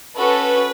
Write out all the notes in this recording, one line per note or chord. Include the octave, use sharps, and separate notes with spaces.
C#4 F#4 A4 B4